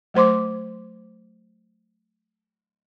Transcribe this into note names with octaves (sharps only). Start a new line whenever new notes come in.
F#3 A3 C5 C6 D6